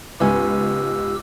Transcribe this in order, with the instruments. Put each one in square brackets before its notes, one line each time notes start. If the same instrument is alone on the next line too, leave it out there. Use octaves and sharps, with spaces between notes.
[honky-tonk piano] C#2 G#2 [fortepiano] B3 C#4 G#5 [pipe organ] G4 E6